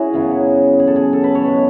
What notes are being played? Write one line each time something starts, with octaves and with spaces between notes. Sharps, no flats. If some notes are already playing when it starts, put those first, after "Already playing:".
Already playing: C#4 E4 F#4 G#4
F#2 C#3 F#3 B3
G#4
A4
G#4
A4
B4
C#5
B2 G#3 B3